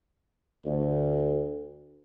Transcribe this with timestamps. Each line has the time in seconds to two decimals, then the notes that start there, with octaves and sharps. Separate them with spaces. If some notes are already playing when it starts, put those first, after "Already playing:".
0.66 D2